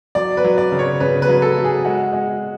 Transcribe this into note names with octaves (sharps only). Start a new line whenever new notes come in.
F#3 D5
B4
F#3
D5
C#3
C#5
C#3 B4
B4
F#3
A4
F#3
G#4
G#3 F#4
G#3